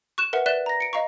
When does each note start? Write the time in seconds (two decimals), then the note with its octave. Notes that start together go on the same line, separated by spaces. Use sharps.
0.18 C#6 F#6 E7
0.33 A#4 B4 E5 F#5
0.46 B4 D5 E5 F#6 E7 G7
0.66 A#5 A#6
0.80 C#7 D7
0.93 D#5 F5 A#5 C#6